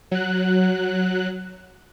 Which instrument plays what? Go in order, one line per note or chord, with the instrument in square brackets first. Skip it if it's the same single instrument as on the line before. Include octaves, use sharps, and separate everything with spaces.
[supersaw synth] F#3 F#6